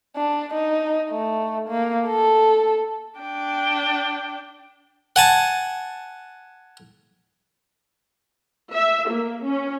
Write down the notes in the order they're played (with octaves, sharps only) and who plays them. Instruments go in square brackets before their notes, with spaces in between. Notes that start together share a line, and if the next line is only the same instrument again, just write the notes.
[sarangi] D4
D#4
A3
A#3
A4
[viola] D4 G5
[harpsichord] F#5 G#5 A5
[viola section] E5
A#3
C#4